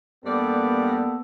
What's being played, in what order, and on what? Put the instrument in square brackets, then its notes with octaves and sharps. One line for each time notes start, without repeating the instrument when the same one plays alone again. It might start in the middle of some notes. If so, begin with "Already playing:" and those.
[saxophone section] G2 G3 D5 [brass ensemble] A#3 B3 A4